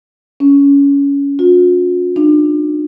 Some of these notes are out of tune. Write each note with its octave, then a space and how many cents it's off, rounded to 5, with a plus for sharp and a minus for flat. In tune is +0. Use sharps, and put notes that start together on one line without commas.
C#4 +20
F4 +45
D4 +40